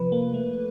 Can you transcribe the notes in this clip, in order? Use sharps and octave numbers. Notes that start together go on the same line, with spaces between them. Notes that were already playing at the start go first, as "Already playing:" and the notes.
Already playing: C3 F3 B4
A#3
A3